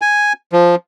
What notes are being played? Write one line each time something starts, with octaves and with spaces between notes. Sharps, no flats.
G#5
F3